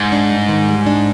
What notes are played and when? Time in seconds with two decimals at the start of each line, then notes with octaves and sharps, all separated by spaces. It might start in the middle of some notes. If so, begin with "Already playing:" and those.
Already playing: G#2
0.12 D4
0.30 G2
0.49 D#3
0.69 G3
0.86 D4